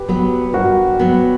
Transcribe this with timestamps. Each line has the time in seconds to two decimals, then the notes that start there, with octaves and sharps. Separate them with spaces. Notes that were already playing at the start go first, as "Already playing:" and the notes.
Already playing: G4 B4
0.08 F#3 B3
0.54 G2 F#4 A#4
0.99 F#3 B3